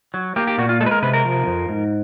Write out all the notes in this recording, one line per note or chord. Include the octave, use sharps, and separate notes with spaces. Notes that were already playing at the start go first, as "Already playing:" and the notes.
F#3
A#3 G4
G4
A#2 F#4
F4
G#3 A4
B4
A#4
C3 B4
A#4
F3
F2
G#2